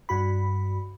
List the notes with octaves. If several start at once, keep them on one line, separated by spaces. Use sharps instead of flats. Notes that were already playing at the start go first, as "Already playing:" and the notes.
G2 F#4 B5